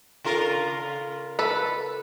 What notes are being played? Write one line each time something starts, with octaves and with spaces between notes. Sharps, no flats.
C#3 F4 A#4
A4 B4